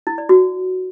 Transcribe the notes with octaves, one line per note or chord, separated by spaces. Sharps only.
E4
D5
F#4